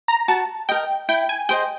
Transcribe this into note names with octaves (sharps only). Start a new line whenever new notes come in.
A#5
F#4 A5
A#4 D#5 G5
E4 G5
G#5
G#4 C5 D#5 G5